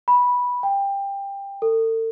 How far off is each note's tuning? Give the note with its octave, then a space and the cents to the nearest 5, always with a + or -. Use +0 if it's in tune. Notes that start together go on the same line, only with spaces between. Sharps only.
B5 -10
G5 +20
A4 +40